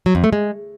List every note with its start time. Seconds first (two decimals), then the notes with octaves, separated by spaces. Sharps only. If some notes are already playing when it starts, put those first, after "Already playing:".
0.06 F#3
0.15 F2
0.24 A3
0.33 G#3